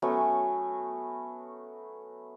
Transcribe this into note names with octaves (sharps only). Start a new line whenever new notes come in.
F#3 A3 B3 C#4